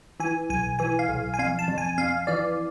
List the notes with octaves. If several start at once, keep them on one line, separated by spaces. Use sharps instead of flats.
E3 G#5
B1 G#5
E3 G#5
F5
B1
G#5
F2 F5
A5
F2
G#5
F2 F5
E3 D5